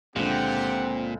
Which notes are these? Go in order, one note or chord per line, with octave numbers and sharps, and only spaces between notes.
C#2 A#2 D3 C4 G4 F#5